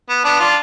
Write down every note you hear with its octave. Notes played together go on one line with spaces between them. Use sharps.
B3
B3 D4
D4 F4